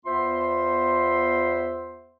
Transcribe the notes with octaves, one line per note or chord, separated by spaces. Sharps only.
E2 B3 F4 C5 E5 C6